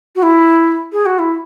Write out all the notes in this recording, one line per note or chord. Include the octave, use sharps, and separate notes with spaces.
F#4
E4
G#4
F#4
E4